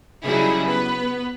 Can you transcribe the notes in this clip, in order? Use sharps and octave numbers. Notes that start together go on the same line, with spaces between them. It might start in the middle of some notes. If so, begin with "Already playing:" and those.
C#3 F#3 G3 D#4 E4 G#4
B3 B4